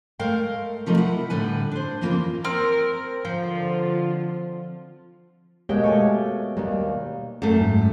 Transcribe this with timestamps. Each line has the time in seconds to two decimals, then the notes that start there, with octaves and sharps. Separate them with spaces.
0.19 G#3 A3 A#4 F5 G5
0.86 C3 F3 G3 A3 D#4 A#4
0.97 E4 A#4 F#5
1.30 A2 D3 G3 B4 G#5
1.71 D4 C5
2.01 F2 C#3 E3 A#3 F4
2.44 C4 A#4 F6
3.25 D3 F3 F4
5.69 B2 G#3 A#3 G4 C#5 G5
5.84 A3 C#5 G#5 A5
6.57 D#2 G3 A#3
7.42 F#2 A3
7.61 G#2